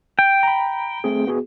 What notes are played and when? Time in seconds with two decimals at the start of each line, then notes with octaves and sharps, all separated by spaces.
0.19 G5
0.43 A#5 B5
1.04 A3 C4 G#4
1.27 B3 F#4 G#4